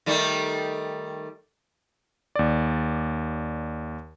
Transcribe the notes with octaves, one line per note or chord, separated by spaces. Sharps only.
D#3 G3 A3
D#2 D5